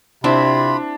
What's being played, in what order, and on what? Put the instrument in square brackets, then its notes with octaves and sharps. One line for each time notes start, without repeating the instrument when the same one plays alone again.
[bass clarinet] C3 [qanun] C4 E4 E5 [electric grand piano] D4 [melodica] F4 B5